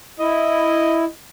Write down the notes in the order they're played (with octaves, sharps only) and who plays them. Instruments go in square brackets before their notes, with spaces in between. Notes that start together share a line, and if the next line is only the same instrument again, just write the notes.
[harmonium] E4 [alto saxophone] D#5